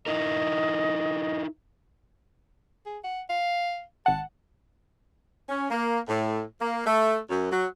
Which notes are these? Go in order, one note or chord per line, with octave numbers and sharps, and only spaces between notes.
D#4 E4 A#4 D#5
G#4
F#5
F5
G#1 F#5 A5
C#4
A#3
A2
A#3
A3
F#2
F#3